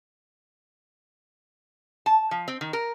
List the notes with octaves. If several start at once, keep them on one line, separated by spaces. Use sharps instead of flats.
A5
F3
C4
D#3
A#4